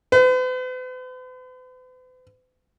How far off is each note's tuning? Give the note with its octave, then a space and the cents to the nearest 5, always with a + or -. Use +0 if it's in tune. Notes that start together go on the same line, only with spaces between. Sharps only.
B4 +45